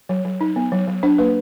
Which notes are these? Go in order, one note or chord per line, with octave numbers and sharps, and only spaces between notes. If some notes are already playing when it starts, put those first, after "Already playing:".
F#3
F#3
D#4
B3
F#3
F#3
D4 C5
A#3 B4